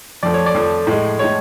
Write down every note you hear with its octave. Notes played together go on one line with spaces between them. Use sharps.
F2 F3 A3 D5
C#5
D5
F2 F3 A3
A2 G#3
A2 G#3 C#5